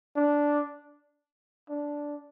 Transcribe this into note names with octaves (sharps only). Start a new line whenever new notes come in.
D4
D4